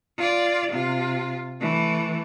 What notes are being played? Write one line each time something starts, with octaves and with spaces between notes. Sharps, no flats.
F4 D5
C3 F4
E3 A3